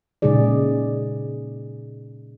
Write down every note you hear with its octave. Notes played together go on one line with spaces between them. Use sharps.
A#2 C#3 G#3 D#4 G#4 D5